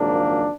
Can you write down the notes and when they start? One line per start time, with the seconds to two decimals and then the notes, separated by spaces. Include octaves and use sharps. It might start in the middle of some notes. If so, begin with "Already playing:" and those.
Already playing: G#1 F#2 C#3 F3 A#3 D4